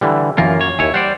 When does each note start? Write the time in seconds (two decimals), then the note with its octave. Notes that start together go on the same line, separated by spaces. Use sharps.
0.01 D3 E3 G3
0.38 F#2 E3 A#3 F4 A#4
0.61 C#5
0.79 D#2 E4 C#5 G#5
0.94 G3 C5 D5 F#5